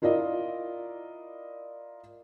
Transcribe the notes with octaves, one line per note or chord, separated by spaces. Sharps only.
E4 F4 A#4 D5 D#5